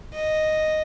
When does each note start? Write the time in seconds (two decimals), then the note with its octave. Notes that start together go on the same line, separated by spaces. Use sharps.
0.13 D#5